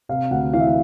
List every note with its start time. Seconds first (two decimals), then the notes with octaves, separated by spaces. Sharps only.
0.09 C3 F5
0.31 D2 F#5
0.53 E3 F5
0.60 E5
0.67 F5